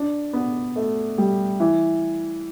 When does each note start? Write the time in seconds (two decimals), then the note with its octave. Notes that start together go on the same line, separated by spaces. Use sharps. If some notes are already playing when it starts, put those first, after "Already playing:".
Already playing: D4
0.33 B3
0.76 A3
1.18 G3
1.60 E3